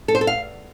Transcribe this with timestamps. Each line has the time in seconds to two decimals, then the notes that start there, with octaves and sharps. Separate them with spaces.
0.08 A4
0.15 C5
0.21 A4
0.27 F5